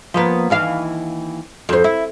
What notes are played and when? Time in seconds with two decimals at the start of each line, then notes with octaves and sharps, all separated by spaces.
0.14 F3 A#3 B3
0.50 D#2 E3 F5
1.69 F2 C5
1.84 E4